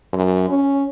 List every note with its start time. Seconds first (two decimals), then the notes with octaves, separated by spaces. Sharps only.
0.13 F#2
0.49 C#4